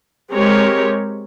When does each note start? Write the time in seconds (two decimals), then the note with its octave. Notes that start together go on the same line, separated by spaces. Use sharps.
0.30 G#3 C4 G4 A#4 C#5